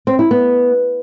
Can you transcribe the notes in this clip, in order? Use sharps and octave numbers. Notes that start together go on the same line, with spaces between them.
C4
E4
B3